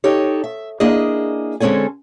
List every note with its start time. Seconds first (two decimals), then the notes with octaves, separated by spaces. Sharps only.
0.04 D#4 G4 A4 C#5
0.44 E5
0.80 A#3 D4 E4 G#4 D#5
1.60 D3 G#3 C4 C#4 A4 G#5